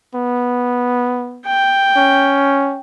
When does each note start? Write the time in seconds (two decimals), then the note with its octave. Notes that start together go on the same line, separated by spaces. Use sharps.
0.15 B3
1.46 G5
1.96 C#4